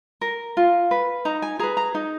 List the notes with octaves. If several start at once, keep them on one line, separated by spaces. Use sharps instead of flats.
A#4
F4
B4
D#4 A#5
G#5
G#4 B4 A#5
A#5
D#4